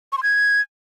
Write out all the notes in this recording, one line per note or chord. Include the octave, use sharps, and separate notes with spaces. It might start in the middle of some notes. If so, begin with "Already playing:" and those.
C#6
C6
G#6